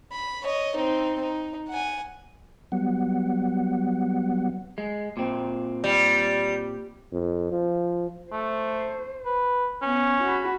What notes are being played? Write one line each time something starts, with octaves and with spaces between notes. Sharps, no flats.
B5
C#5 D#5
C4 D#4
D#4
F#5 G#5
F#3 G3 B3 F#5
G#3
A#2 C4
G3
F2
F3
A3 C5
B4
B3 C#4
F#4 B5